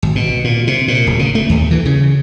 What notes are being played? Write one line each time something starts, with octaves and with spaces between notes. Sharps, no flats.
G#1
B2
A#2
C3
A#2
D1
C#3
A3
D#2
E3
C#3